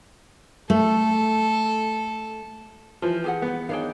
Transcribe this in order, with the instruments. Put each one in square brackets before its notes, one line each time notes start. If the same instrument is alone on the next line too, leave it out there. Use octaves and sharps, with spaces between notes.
[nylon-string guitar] A3 [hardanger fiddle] A4
[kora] E3 [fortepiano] F3
[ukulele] G4 G#4 F#5
[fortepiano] B3
[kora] D#3 D4 G5 [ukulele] G#4 C#5 F5